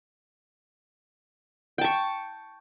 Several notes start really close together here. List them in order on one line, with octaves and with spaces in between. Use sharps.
G5 A5 C#6